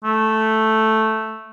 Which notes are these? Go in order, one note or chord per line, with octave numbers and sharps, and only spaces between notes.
A3